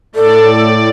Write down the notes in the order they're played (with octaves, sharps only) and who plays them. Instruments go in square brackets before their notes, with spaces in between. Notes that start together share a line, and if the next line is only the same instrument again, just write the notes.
[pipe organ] A2 D5 [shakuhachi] A4